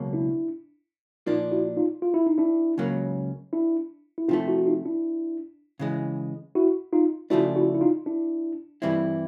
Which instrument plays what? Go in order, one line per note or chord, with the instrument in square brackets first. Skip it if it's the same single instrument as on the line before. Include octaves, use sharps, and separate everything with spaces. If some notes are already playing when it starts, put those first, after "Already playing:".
Already playing: [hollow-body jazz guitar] C#2 B2 F#3 A#3
[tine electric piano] D4 E4
[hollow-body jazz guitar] A#2 F3 A#3 D4 [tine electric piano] D#4 F4
[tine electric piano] E4 F#4
D#4 F4
F4
E4
D#4
D4 E4
[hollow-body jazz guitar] C#2 C#3 F#3 A#3
[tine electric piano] D4 E4
E4
[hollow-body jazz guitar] C3 F3 A3 [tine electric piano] D#4 F4
[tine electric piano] E4 F#4
F#4
D#4 F4
D4 E4
[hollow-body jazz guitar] C#3 E3 G#3
[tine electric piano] E4 F#4
D#4 F4
[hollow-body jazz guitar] C#3 F3 A3 D4 [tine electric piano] E4 F#4
[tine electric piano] E4 F#4
E4
D#4 F4
D4 E4
[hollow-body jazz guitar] G2 E3 G3 C4 E4